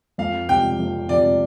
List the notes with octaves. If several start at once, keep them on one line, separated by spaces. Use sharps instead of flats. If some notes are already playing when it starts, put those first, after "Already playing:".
F2 F5
C3 F3 G5
F2
C3 F3 D5